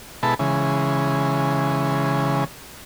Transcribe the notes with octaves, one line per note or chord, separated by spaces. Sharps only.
B2 G#3 E4 A4 A5 B5
C#3 E3 G#3